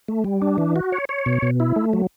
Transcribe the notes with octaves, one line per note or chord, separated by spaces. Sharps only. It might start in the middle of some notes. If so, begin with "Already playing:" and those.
A3
G3
D4
E3
F#4
C#5
C#5
B2
B2
E4
A3
F#3